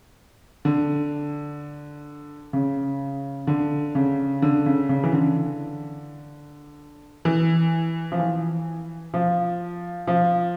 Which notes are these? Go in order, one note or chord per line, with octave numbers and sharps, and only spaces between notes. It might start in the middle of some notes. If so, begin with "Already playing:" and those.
D3
C#3
D3
C#3
D3
C#3
C#3
E3
D3
E3
F3
E3
F3
F3